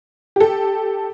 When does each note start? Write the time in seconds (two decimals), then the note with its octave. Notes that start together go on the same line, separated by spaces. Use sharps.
0.36 G4 A4